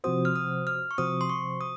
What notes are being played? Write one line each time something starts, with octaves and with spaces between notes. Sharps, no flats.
C3 F3 C4 F#4 C5 D#6
F6
D#6
F6
C#6
C3 F3 C4 F#4 C5 D#6
C6
C#6
D#6